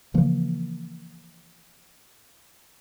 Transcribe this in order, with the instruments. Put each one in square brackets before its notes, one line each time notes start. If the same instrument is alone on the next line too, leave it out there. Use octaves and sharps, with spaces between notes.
[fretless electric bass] C#3 E3 F3 A#3